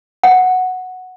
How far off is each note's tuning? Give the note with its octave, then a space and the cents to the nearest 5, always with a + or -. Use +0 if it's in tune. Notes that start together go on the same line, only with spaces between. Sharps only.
F#5 -5